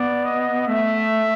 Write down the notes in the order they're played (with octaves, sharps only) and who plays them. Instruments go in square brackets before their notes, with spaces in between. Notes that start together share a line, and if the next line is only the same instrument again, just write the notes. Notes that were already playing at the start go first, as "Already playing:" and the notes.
Already playing: [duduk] B3 [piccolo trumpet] D5
[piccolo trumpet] D#5
[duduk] A3 [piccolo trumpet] E5